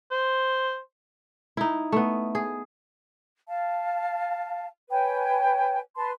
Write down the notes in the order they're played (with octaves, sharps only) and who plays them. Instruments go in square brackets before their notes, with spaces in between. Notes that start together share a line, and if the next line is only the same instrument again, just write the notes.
[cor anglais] C5
[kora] D#4 E4
A3 B3
G#4
[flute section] F5 A5
B4 C#5 G5 G#5
B4 A5 C6